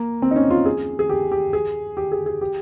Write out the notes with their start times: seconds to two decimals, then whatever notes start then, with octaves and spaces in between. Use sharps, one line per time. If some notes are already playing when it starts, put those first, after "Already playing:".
Already playing: A#3
0.22 C4
0.31 D#4
0.36 C#4
0.50 F4
0.66 G#4
0.99 G#4
1.09 G4
1.32 G4
1.53 G#4
1.97 G4
2.12 G#4
2.26 G#4
2.41 G4